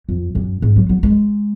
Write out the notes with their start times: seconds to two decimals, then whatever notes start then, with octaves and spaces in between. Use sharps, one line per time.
0.09 F2
0.35 F#2
0.62 G#2
0.76 F#3
0.89 F#3
1.03 G#3